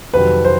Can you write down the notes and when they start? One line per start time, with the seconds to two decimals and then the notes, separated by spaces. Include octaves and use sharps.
0.14 F2 C3 D#3 F#3 B4
0.45 C5